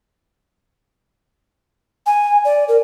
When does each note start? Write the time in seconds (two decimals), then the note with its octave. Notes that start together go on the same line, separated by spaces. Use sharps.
2.06 G#5
2.45 D5
2.68 A#4